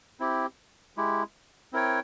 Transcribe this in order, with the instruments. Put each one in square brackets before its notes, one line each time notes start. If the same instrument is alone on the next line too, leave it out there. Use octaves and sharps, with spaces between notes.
[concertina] C4 E4 G4
G#3 E4 G4
C4 E4 A#4 C#5 G5